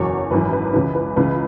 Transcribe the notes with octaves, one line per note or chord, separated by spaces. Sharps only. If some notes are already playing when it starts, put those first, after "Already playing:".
Already playing: F#1 E2 B2 F#3 C#5
G#1 F#2 E3 B4
B4
C#2 C#3 E3 B4
B4
C#2 C#3 E3 B4